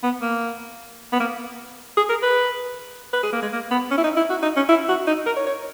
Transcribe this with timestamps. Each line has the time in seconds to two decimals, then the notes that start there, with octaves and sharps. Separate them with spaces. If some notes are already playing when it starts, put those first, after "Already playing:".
0.04 B3
0.22 A#3
1.13 B3
1.20 A#3
1.97 G#4
2.10 A#4
2.23 B4
3.13 B4
3.23 G#4
3.33 A#3
3.42 G#3
3.53 A#3
3.71 B3
3.91 C#4
3.98 E4
4.04 D#4
4.17 E4
4.30 F#4
4.43 D#4
4.57 C#4
4.69 E4
4.89 F#4
5.07 D#4
5.26 A#4
5.37 C#5
5.47 C#5